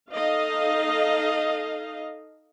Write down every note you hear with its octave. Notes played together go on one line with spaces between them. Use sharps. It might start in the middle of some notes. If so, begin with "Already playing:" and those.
D#4 A4 D#5 F5